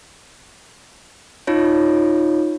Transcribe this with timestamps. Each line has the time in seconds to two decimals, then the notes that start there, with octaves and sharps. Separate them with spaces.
1.47 D#4 F4 C#5